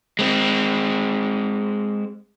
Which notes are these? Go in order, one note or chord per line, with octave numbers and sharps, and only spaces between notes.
G#3 C4